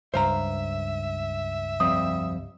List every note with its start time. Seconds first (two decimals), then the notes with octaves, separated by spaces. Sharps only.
0.14 C#2 G2 C5 E5 F5 A#5
1.80 F2 G3 C4 D#6